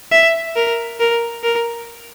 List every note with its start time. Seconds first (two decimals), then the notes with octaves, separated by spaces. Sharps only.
0.12 E5
0.56 A#4
1.00 A#4
1.43 A#4